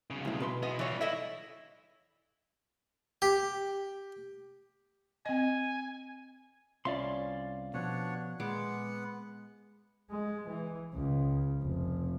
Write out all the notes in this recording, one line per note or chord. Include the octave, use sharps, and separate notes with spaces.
B1 C#3
C2 A2
B2 B4 C6
E3 B3 D#5
E3 G3 F4 C#5
E4 A4 D#5 E5
G4
C4 D#5 G#5
C2 C#4 F4 D5 E5 F5 C6
B2 F3 B3 D4 C#5 F#5
A#2 G#3 B3 F#5 D6
G#3
E3
C#2
F1